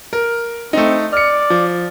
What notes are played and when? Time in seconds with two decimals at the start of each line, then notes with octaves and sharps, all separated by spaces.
0.13 A#4
0.73 A3 C4 D#4
1.13 D5 F6 C#7
1.50 F3